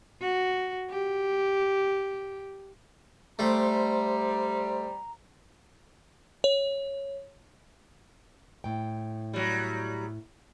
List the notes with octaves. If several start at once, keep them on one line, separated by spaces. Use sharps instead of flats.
F#4
G4
G3 A3 C5 A#5 C6
C#5
A2 G5
F#3 G3